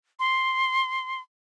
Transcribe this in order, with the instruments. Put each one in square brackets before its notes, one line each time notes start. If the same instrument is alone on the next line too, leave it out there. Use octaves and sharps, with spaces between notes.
[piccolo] C6